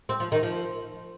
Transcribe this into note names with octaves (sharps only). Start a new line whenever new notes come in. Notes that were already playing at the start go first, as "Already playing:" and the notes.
C4
F3
D#3
F3